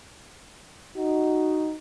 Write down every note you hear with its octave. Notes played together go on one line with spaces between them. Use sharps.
D#4 F#4